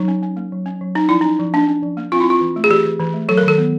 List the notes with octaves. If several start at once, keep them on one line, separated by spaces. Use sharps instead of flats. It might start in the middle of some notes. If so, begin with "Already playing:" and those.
Already playing: F#3 D#4
C#4
C#4
A#3
F#3
C#4
F#3
C#4 D#4
F3 E4
C#4 D#4
F3
A#3 D4
C#4
F3
A#3
C4 F4
E4
C4 F4
E3
A3
G#4
E3 G4
E3
E3
A3
F#3 A4
A#4
D#3 A4
B3